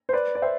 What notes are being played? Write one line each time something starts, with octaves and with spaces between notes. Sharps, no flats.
C5
B4 D5
D5
C5 E5